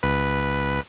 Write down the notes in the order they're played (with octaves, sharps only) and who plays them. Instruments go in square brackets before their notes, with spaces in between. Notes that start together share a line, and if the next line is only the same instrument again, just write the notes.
[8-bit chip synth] C#2 B4